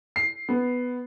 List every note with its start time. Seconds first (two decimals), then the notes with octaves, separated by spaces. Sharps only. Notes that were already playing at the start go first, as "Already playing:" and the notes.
0.16 C7
0.49 B3